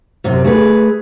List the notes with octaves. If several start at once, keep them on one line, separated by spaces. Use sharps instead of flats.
F#2 C3
A3 G#4 B4